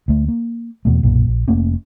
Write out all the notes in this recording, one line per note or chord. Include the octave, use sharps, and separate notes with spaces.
D2 A3
A#3
E2 B2 A3
B1 F#2 A#2
A#1
F1 A3 A#3 C#4